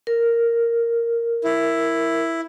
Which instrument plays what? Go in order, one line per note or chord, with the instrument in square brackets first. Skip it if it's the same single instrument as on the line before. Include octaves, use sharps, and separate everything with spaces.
[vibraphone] A#4
[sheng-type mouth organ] E4